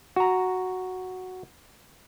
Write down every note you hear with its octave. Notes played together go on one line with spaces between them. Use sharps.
F#4 A#5